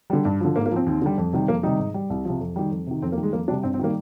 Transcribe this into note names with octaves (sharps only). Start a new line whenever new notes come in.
D3 G3
G2
D3 F3
G#2 A#3
A#3
F3 C4
D#2
D3 G3
F2
C3 D#3 G3
F2 A#3
C3 D#3 G3 D#4
G#2
G3
C2
C3 F3
F2
D#3 G3
F2
C3 D#3
F2 C4
A#3
D#3 G3
G#3
F2 A#3
C3 G3 D4
G2 C4
C4
D#3 G3 A#3